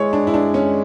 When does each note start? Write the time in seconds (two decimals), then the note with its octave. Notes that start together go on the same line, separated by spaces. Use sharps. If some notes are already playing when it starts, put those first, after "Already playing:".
Already playing: G#3 E4 C#5
0.13 D4
0.27 E4
0.34 D4
0.54 C#4